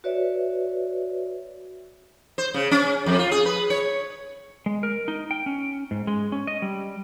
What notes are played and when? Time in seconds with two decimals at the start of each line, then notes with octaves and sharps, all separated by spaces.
0.04 F#4 B4 C#5 D5 E5
2.38 C5
2.54 C#3
2.71 C#4
3.06 F2
3.19 F4
3.31 G#4
3.45 B4
3.70 C#5
4.66 G#3
4.83 A#4
5.08 D#4
5.31 G5
5.46 C#4
5.91 G#2
6.07 G#3
6.32 C#4
6.47 D#5
6.62 G3